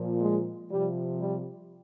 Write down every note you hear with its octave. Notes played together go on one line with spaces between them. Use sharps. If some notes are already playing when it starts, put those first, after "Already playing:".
Already playing: A#2 F3
G#3
C3 F3 G3
G3